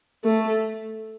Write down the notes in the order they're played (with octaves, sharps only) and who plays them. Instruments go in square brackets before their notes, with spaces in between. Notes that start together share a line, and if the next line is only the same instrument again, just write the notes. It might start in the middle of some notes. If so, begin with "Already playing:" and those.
[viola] A3